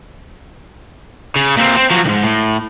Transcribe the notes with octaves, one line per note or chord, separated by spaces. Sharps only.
C#3
A#2 C4
C4
F3 F#3
C2 G#2
A2